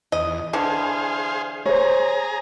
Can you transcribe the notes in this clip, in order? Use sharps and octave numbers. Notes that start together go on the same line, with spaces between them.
E2 D#5
D3 E3 G#4 C5 F5
G#4 C5 C#5 A#5